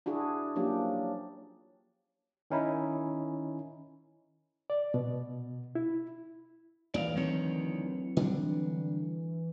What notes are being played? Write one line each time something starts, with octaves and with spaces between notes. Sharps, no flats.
D4 E4 F#4 G#4
F3 F#3 A#3 C#4 D4 G4
D#3 C#4 D#4 E4
D5
B2
E4
D#1 D#2 A2 E3 D5 D#5 F5
D2 D#3 F#3 C4 C#5
D3 G3 D4